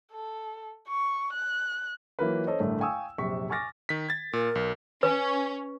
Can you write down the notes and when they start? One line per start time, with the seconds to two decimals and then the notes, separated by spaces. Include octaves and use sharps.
0.12 A4
0.88 C#6
1.33 F#6
2.19 E3 F#3 A#3 F4 A#4 B4
2.47 C#4 A4 C5 C#5 D#5
2.60 A1 G2 D3 A3 A#4 E5
2.80 F5 G5 G#5 C#6 D#6 E6
3.18 A#1 F#2 C3 C#6 B6
3.50 G#5 C#6 D6 F6 A6 A#6
3.89 D#3 B6
4.09 G#6 A6
4.33 A#2 A#4
4.55 B1
5.03 C#4 B4